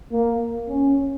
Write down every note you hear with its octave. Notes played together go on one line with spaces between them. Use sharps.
A#3
C#4